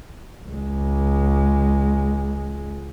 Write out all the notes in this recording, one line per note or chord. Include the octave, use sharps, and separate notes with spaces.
C#2 G#3